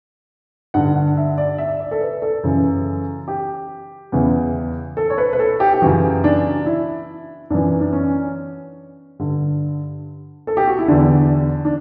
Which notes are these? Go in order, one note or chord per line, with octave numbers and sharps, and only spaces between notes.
G2 D3 F#5
F#5
E5
D5
E5
D5
A4
B4
A4
F#2 C#3 E3
G4
E2 C#3 E3
A4
C#5
B4
B4
A4
G4
G4
F#2 C#3 E3 F#4
D4
E4
F#2 E3 D4
D4
C#4
G2 D3
A4
G4
F#4
E4
E2 D3 D4
D4